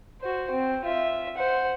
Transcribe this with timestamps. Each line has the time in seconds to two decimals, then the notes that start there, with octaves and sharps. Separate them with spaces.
0.21 F#4 C5
0.51 C4
0.85 F4 E5
1.37 C5 F#5